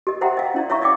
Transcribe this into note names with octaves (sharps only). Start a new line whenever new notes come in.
G4 D#5
C5 E5 F#5 G5 A#5
D#5 F5
C#4 E4 D5
C#5 E5 F5 A#5 C#6
D5 D#5 F5 G5 D6